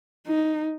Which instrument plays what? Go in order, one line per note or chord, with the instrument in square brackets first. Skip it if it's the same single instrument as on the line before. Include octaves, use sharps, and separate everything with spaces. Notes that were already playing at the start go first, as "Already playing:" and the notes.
[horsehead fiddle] D#4